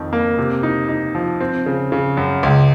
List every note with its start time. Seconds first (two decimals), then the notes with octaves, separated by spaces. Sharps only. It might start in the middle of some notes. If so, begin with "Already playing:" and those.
Already playing: F2 D#3
0.13 A#3
0.38 C3
0.63 D#4
0.88 D#4
1.15 F3
1.40 C4
1.66 C#3
1.92 C#3
2.17 F#2
2.43 C#2